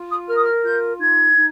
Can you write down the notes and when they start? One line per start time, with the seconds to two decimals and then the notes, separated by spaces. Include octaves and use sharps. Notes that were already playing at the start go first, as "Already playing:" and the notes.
Already playing: F4
0.09 D#6
0.27 A#4 F6
0.35 D#6
0.43 F6
0.64 F4 G6
0.99 D#4 G#6
1.36 D#4